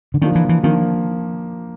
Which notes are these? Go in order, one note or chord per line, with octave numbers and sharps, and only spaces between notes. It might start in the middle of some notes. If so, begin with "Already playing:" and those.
D3
D#3 F3 A#3 D4
E3
E3
D#3 F3 A#3 D4